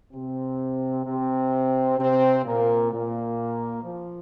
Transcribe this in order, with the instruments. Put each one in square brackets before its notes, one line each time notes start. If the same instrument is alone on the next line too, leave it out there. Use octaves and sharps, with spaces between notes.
[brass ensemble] C3 C4
C3 C4
C3 C4
A#2 A#3
A#2 A#3
F3